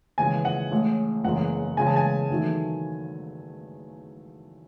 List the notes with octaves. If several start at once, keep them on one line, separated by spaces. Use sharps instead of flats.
D#2 C#3 E3 G#3 G#5
F#5
A1 A2 G#3
F#1 E2 C#3 E3 G#3 F#5
E1 E2 C#3 G#3 G#5
A5
G#5
E2 D#3 F#3 A3